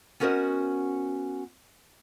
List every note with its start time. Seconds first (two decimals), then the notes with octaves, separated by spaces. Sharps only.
0.20 B3 C#4 F#4 A#4 C5 D#5